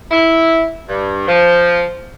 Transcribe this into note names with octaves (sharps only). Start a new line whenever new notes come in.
E4
G2
F3